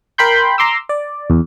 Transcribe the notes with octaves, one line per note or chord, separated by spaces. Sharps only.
A#4 G5 B5 C6 G6
A#5 C6 D6 E6
D5
E2